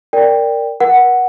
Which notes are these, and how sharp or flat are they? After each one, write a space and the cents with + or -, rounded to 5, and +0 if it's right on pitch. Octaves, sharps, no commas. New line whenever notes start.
A#4 -10 D5 +0 G5 +10
A#4 +45 F#5 +0